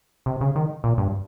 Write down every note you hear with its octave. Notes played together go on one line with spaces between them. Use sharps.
C3
C#3
D#3
A#2
G2